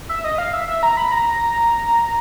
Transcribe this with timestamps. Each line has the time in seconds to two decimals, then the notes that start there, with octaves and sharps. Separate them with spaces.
0.09 E5
0.24 D#5
0.38 F5
0.53 E5
0.68 E5
0.83 A#5
0.97 B5
1.12 A#5